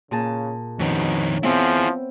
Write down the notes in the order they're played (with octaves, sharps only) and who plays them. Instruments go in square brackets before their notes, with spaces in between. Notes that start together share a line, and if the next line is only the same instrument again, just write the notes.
[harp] A#2 G#4 A5 [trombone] C#3
[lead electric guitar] F2 D#3 [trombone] B2 [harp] C#4
[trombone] F3 [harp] B3 C4 E5 [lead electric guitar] E4 G#4